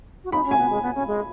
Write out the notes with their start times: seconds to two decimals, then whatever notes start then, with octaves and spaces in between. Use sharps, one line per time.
0.24 F#4
0.32 D#4 B5
0.45 C#4
0.51 G#5
0.58 B3
0.70 G#3
0.82 B3
0.95 C#4
1.07 G#3